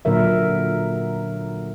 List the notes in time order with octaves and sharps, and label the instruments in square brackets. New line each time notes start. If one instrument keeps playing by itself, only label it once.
[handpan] A#2 D3 F#3 A#4 E5